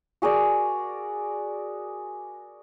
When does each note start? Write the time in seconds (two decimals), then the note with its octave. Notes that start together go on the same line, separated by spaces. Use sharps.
0.22 F#4 G#4 A#4 D5